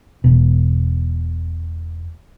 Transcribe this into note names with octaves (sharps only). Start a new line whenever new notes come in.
E1 B2